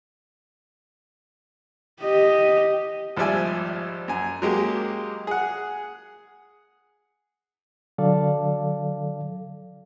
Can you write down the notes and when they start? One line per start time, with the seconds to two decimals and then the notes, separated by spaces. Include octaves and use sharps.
2.02 G4 D#5
3.17 G#1 F3 G3 D5 E5 G#5
4.08 F#2 G#5
4.42 F#3 G#3 A#3 G4
5.27 G#4 F#5
7.98 D3 F#3 A4 D5 F5